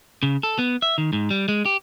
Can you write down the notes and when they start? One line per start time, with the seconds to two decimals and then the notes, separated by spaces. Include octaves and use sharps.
0.23 C#3
0.43 A4
0.59 B3
0.82 E5
0.98 D#3
1.13 G#2
1.31 G3
1.48 G#3
1.65 G4